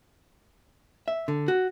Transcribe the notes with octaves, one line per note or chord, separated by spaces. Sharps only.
E5
D3
F#4